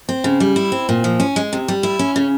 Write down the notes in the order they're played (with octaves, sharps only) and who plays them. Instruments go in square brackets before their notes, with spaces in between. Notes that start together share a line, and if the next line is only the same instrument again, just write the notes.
[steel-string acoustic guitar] C4
C#3
G3
E4
C4
A#2
F3
C#4
G#3
C3
G3
E4
C#4
C#3